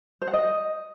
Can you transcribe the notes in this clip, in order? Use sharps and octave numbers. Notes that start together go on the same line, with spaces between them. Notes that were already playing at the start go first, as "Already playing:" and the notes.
C5
F#5
D#5